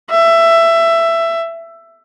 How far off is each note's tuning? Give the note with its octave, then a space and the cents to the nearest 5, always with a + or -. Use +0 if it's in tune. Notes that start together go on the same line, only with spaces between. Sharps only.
E5 +15